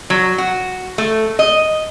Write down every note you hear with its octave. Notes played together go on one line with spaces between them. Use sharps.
F#3
F#4
A3
D#5